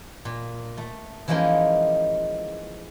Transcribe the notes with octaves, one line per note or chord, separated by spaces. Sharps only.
A#2
A3
E3 F3 G#3 A#3 C#4 D#4